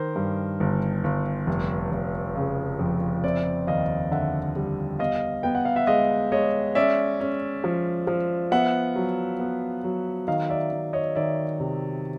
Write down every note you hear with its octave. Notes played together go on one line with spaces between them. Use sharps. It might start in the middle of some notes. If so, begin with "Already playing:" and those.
Already playing: D#3 A#4 C5
G2
G1
G1
F1
F1
C#3
F2
C4 D5 E5
D#2 D#5 F5
D3 E5 F#5
G3
B3 D#5 F5
B3 G5
F#5
F5
E5 F#5
G#3 D#5 F5
G#3 C#5 D#5
C#4 D5 E5
C#4
F3
F3
B3 E5 F#5
F#3
B3
F#3
D#3 D#5 F5
D5 E5
D#3
C#5 D#5
D#3 D5 E5
C3